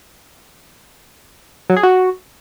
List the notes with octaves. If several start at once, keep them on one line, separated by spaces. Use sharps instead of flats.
F#3
G#4
F#4